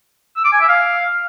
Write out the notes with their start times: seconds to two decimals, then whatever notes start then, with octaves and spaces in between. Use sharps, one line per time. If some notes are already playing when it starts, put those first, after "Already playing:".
0.36 E6
0.44 D6
0.52 G#5
0.60 E5
0.68 F5